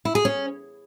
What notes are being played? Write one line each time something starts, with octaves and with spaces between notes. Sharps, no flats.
E4
G#4
C#4